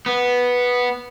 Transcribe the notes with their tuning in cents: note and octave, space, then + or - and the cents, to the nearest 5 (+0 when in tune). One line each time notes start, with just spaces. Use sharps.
B3 -5